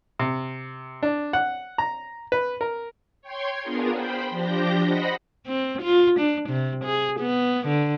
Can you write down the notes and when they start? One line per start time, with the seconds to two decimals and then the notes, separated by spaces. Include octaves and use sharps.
0.19 C3
1.03 D4
1.33 F#5
1.78 A#5
2.32 B4
2.61 A#4
3.21 C#5 G5 C6 G#6
3.61 B3 D4 F4 G#4 A#4
3.91 C5 G5 B5
4.30 F3 D4 G4 G6 A#6
4.83 C5 D#5 F#5 B5 A#6
5.47 C4
5.82 F4
6.19 D4
6.50 C3
6.84 G#4
7.20 B3
7.67 D3